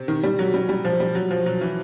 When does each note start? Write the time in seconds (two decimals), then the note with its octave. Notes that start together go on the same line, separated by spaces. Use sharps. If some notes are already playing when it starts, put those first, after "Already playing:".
Already playing: C3
0.08 D#3
0.23 G3
0.39 F#3
0.54 G3
0.69 G3
0.85 F3
1.00 G3
1.15 F#3
1.31 F3
1.46 F#3
1.61 E3